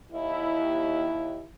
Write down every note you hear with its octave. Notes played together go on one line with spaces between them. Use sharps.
D#2 E4